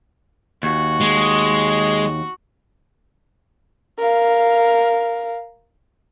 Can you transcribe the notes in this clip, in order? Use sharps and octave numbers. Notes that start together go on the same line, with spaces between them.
D#2 F#4
G#3
A#4 F5